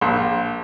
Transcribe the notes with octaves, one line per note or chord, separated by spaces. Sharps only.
A#1